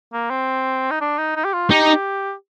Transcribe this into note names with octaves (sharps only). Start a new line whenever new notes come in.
A#3
C4
D#4
D4
D#4
D#4
G4
F4
D#4 G4